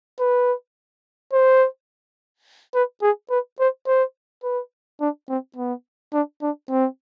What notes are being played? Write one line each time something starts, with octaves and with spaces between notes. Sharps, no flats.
B4
C5
B4
G#4
B4
C5
C5
B4
D4
C4
B3
D4
D4
C4